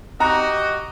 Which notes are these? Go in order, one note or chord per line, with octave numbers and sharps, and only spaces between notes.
F#4 G4 D#5 A#5